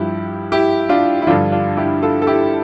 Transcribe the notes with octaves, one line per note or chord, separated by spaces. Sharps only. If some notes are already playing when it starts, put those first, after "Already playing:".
Already playing: G2 F3 E4 G4
E4 G4
D4 F4
E4
G2 D3 F3 D4 F4
D4 F4
E4 G4
F4 A4
A4
E4 G4